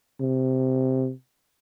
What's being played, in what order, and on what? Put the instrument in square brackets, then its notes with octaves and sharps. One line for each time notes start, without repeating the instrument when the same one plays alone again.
[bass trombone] C3